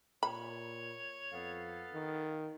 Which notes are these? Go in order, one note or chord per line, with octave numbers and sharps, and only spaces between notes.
A#2 C#5 B5
F2 B3 A4 F5
D#3